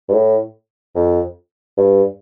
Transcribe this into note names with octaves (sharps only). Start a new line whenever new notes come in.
G2
A2
F2
G2